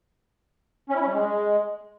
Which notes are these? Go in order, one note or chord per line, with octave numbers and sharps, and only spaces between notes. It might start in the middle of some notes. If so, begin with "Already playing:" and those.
C#4
E4
C#4
G3
G#3